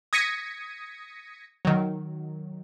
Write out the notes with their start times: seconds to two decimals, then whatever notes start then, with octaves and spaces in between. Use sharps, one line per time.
0.13 D#6 G#6 A#6 B6 C#7 D#7
1.65 D#3 F#3